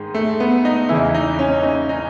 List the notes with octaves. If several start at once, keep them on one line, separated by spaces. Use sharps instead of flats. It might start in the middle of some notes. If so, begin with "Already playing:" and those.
Already playing: G#2 D#3 G#3
A3
B3
D#4
E2 C#3 E3 E4
D#4
C#4
D#4
D#4